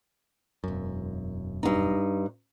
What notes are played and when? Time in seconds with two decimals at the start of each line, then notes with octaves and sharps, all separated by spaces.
0.64 E1 F#2
1.63 G2 D#4